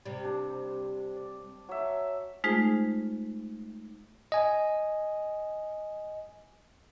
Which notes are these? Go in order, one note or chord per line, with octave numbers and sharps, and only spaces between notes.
C3 G3
D4
D5
F#3 E5
G#3 A3 D#4 F4 G#4 C5
D#5 G#5